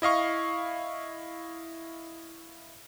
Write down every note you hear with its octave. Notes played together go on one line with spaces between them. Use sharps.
E4 D#5 F5 C#6